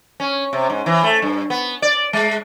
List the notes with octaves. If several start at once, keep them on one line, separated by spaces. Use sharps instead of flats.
C#4
C3
G#2
E3
A3
G2
B3
D5
G#3